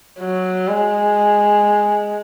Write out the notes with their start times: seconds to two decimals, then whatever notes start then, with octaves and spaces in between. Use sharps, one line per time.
0.19 F#3
0.68 G#3